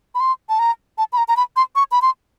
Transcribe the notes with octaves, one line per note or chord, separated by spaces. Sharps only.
B5
C6
A5
A#5
A5
B5
A#5
A#5
B5
C6
C#6
B5
C6